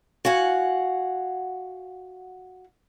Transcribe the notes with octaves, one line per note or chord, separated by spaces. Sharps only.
F#4 F5 F#5 G#5